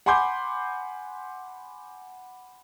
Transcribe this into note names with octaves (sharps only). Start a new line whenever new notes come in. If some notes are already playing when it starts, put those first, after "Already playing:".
F#5 G#5 B5 C6 D6 G6